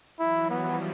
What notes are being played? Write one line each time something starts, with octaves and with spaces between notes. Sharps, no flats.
E3 F#3 E4
F3 G3 B3